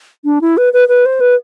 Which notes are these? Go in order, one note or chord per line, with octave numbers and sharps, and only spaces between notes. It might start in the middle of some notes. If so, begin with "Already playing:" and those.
D4
E4
B4
B4
B4
C5
B4